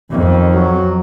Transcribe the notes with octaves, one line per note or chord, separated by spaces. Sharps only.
F2 D#3
F#3